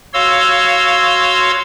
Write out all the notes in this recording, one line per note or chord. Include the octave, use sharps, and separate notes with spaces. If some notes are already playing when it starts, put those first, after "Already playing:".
F#4 C#5 F5 C6 E6